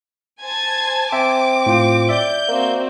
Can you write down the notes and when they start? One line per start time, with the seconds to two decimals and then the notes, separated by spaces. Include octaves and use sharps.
0.42 C5 G#5 A5 G#6 A6
1.12 C4 E5 D6
1.66 A2 F4 G5
2.09 D5 E5 G6
2.48 A#3 C4 F#4